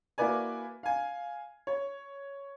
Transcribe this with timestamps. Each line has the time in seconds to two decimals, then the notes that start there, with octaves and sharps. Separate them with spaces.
0.18 A#3 E4 F#4 B4 D5 G#5
0.83 F5 G#5
1.67 C#5